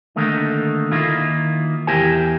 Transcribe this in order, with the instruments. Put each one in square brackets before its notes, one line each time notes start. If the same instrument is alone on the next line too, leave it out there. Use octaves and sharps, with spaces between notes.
[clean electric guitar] D3 D#3 A3 A#3 D#4
D#3 A#3 E4 F4
E2 E4 G4 A#4 C5 G#5